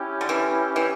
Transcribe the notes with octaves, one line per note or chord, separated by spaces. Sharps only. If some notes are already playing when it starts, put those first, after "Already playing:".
Already playing: C#4 E4 G4
D3
E3
E3